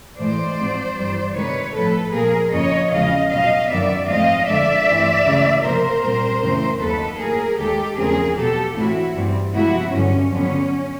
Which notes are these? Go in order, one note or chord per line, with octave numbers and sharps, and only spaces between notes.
A2 E3 G#3 C5 D5
G#2 F3 G#3 C4
G2 E3 G3
C3 D#3 G#3 C4 B4 C#5
A2 F3 A3 C4 A4 B4
A#2 F3 A#3 G#4 A#4
F2 C#3 F3 A#3 C#5 D#5
E2 C#3 F3 G#3 D#5 F5
B2 F#3 B3 D#5 F5
F#2 D#3 F#3 B3 D5 E5
G#2 F3 A3 C4 D#5 F5
F2 D3 F3 G#3 D5 E5
G2 E3 A3 C4
D2 C#3 E3 G#3
C3 F3 A#3 A#4 C5
A#2 G3 C4
F#2 C#3 E3 A3 C4
D#2 D#3 F#3 A#3 A4 B4
A2 F#3 A#3 G#4 A#4
D#2 D#3 G#3 G4 A4
E2 C#3 F3 A3 C4 G#4 A#4
B2 F#3 B3 G4 A4
A2 E3 A3 C4 E4 F#4
G2 E3 G3 C4
C3 F3 G#3 B3 E4 F#4
G2 D3 F#3 C#4
F2 D3 F#3 B3 C#4